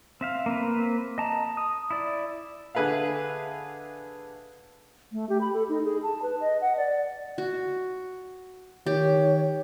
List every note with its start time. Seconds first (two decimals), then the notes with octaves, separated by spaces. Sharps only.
0.21 C4 E5 F5
0.46 A#3 C4 B4
1.18 D#5 A5 A#5
1.57 D#6
1.91 E4 D5
2.75 D3 G#4 B4 E5 F5
5.13 A3
5.29 G4
5.41 B5
5.53 A4
5.69 D#4
5.85 G#4
6.03 A5
6.22 B4
6.41 D#5
6.61 F#5
6.77 D5
7.38 F#4
8.86 D#3 G4 C#5